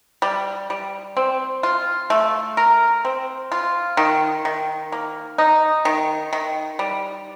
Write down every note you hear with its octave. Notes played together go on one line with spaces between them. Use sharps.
G3
G3
C4
F4
A3
A#4
C4
F4
D#3
D#3
A#3
D#4
D#3
D#3
G3